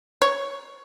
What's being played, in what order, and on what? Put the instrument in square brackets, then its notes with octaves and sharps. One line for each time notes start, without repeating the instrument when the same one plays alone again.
[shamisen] C#5